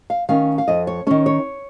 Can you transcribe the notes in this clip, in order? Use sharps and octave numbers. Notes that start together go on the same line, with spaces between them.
F5
D#3 C#4 F5
F5
F2 D#5
C#5
D#3 C#4 C#5
C#5